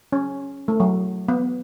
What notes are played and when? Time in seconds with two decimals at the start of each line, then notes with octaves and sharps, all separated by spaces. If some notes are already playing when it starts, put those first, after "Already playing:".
0.12 C#4
0.68 A3
0.80 F#3
1.29 B3